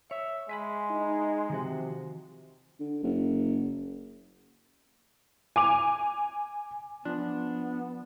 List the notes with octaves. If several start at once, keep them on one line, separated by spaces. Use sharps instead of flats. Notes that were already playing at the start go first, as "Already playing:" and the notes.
C#5 E5
G#3 E5 G#5 B5
D#4
C3 D#3 F3 F#4
D3
F#1
G#5 D6 F7
F3 B3 D4